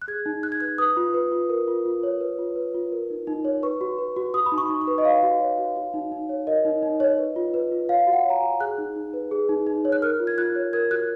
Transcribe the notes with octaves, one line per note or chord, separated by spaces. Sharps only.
F#6
G#4 G#6
D#4
D#4 F#6
G#6
B4 F#6
B4 D#6
F4
B4
F4
A#4
F4
F4
C#5
B4
F4
B4
F4
A#4
D#4
D#4
C#5
B4 C#6
F#4
B4
F#4
F#4 D#6
B5
D#4
C#6
D#4
C#6
B4
D#5
C#5 F5
F#4
C#5
F#4
F#4
D#4
D#4
C#5
A#4 D#5
D#4
D#4
C#5
B4
F4
B4
F4
C#5 F5
F#4
F#5
C#5 A#5
G#5
F#4
G#4 F#6
D#4
D#4
B4
G#4
D#4
D#4
C#5
F#6
A#4 F6
F4
G#6
F4 F#6
C#5
A#4 G#6
F#4 F#6